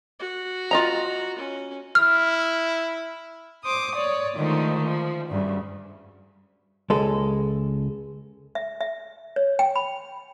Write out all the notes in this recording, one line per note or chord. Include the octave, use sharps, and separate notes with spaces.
F#4
F4 D#5 A#5
C#4
E4 F6
C5 D6 D#6
C#5 D5
D3 D#3 F3 G#3 A3 D#4
F3
D2 G2 C#3
C#2 G#3 A4
E5
E5
C#5
G5
B5